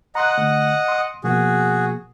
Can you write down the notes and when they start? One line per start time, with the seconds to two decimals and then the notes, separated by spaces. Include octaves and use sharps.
0.15 D#5 F#5 A#5 C6 F#6
0.38 D3 A3
0.88 C6 D#6
1.24 B2 F3 A#3 F#4 G#4